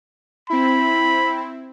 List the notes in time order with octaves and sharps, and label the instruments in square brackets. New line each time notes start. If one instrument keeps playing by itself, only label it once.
[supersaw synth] C4 E4 [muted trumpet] B5